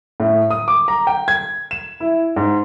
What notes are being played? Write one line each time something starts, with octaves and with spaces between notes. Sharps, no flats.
A2
D#6
D6
A#5
G5
G#6
E7
E4
G#2